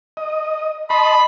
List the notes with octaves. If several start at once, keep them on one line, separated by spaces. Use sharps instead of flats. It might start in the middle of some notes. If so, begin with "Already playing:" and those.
D#5
D#5 A5 B5 C6